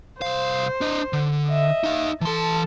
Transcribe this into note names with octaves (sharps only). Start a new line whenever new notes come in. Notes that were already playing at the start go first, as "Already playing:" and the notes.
C2 C5 F5
D4 D#5
D3
D#5 E5
D#4 F5
E3 A4 A5 C6